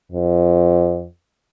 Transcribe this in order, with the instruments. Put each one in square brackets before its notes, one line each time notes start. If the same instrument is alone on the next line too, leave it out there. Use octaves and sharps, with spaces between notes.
[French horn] F2